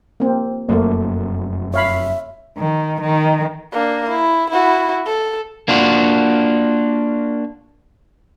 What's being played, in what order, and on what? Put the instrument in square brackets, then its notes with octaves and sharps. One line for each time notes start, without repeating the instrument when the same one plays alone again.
[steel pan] A#3 C4
[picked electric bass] F1 F#2 [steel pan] A3 A#3
[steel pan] C#5 F5 B5 [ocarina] E5
[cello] D#3
D#3
[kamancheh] A#3 D4
E4
E4 F#4
A4
[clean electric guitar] A#3 D4 F4 F#4